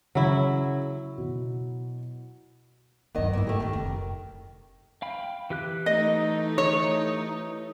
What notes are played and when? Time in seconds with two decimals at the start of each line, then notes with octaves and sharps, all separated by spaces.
0.15 C#3 F#3 E4
1.18 B2
3.15 E2 G2 D#3 F#3 D#5
3.33 G#2 D3 A#3 E4
3.47 A3 G4
3.60 D3 D#3 C4
3.73 F1
5.02 F5 G5 B5
5.50 E3 G4 F#6
5.86 A3 D#4 D#5
6.58 C#5